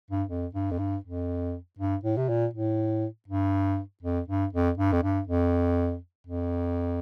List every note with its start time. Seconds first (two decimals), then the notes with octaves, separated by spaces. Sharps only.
0.10 G2
0.29 F2
0.54 G2
0.71 F2
0.79 G2
1.04 F2
1.78 G2
2.04 A2
2.17 C3
2.29 A#2
2.54 A2
3.28 G2
4.03 F2
4.28 G2
4.53 F2
4.78 G2
4.92 F2
5.03 G2
5.28 F2
6.27 F2